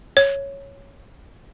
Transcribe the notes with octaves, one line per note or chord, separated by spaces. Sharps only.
C#5